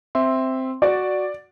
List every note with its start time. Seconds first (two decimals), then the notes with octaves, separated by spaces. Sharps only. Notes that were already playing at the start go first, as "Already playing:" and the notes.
0.15 C4 E5 C6
0.82 F#4 D5